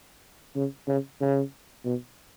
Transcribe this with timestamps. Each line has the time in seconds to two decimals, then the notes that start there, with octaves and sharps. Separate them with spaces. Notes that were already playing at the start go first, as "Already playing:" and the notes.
0.55 C#3
0.88 C#3
1.21 C#3
1.85 B2